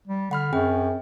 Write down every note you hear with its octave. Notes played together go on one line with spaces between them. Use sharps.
G3
D3 F#5 B5 F6
F#2 C4 G#4 G5